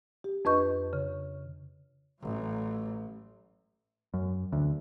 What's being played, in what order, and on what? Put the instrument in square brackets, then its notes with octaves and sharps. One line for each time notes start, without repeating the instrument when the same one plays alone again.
[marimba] G4
F2 D4 B4 D#5 C#6 G6
C#3
[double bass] A1 F#3
[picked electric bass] F#2
D2